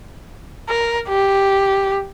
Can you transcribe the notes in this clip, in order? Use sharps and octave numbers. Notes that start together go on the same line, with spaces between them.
A#4
G4